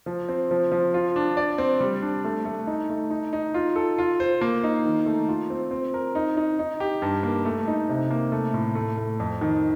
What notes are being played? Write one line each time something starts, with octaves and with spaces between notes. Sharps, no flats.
F3
C4
F3
F3
F4
D4
D5
C4
G3
D4
A3
A3
D#4
A3
D#4
D#4
F4
A4
F4
C5
A#3
D#4
D#3
A3
F4
C4
C4
A#4
D#4
D#4
D#4
G4
G2
A#3
A3
D#4
C3
A#3
A3
A2
A3
A3
F2
D#3